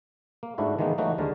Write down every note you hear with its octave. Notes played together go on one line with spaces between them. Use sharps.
A#3
G#2 A3 D4 E4 F#4
D#3 E3 G#3 A#3 B3 D#4
E3 F#3 A3 A#3 D#4 F#4
D#2 D3 G#3 A#4